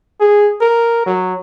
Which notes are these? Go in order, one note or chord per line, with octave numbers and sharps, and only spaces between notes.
G#4
A#4
F#3